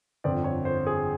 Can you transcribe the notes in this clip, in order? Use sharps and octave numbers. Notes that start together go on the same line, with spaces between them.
G1 F2 D3 D5
C#5
C5
G#4